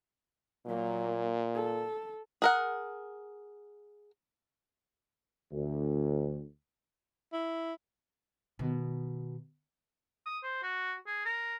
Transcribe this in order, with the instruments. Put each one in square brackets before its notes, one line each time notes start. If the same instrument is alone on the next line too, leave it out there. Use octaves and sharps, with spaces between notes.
[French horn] A#2 [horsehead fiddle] F#3 A#3
[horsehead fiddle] A4
[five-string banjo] G#4 A#4 F#5
[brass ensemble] D2
[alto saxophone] E4
[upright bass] B2 D#3
[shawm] D#6
C5
F#4
G#4
A#4